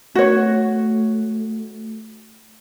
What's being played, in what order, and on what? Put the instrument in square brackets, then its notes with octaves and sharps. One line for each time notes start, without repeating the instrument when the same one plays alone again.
[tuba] A3 [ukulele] F#4 C#5